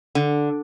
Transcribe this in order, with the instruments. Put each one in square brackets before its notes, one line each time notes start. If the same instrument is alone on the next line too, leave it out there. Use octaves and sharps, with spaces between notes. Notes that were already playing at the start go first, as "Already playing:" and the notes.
[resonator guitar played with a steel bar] D3